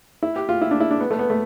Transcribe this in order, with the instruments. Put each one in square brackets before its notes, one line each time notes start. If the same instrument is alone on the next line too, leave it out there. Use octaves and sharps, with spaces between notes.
[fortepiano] E4
G4
F4
E4
D4
E4
D4
B3
A3
B3
A3